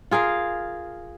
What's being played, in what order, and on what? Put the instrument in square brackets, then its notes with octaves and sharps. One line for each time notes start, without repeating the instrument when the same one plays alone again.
[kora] F4 G#4 A#4 F5